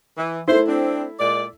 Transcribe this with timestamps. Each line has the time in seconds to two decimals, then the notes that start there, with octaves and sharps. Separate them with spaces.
0.18 E3
0.48 A3 E4 C5
0.68 C4 D4
1.19 A#2 G#3 D5